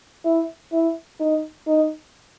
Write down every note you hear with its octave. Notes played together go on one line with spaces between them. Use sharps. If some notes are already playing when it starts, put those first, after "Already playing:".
E4
E4
D#4
D#4